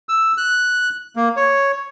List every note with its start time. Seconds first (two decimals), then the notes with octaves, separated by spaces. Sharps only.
0.09 E6
0.38 F#6
1.16 A#3
1.36 C#5